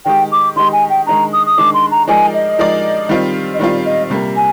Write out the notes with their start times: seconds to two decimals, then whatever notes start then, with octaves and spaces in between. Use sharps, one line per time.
0.05 D#3 G#3 D#4 G4 G5
0.32 D6
0.56 D#3 G#3 D#4 G4 C6
0.72 G#5
0.89 G5
1.06 D#3 G#3 D4 A#5
1.33 D#6
1.46 D#6
1.58 D#3 G#3 D4 D6
1.74 C6
1.91 A#5
2.08 F3 G#3 D#4 A#4 D5 G#5
2.34 D#5
2.59 F3 G#3 D#4 A#4 D5
3.09 D#3 G3 C4 F4
3.54 D#5
3.59 D#3 G3 C4 F4 D5
3.85 D#5
4.10 C3 G3 A#3
4.36 G#5